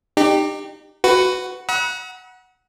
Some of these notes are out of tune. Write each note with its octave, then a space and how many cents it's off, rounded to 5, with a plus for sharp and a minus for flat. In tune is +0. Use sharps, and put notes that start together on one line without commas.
D#4 -30 G4 +10
F#4 +0 B4 +15
F#5 +0 B5 -45 E6 -45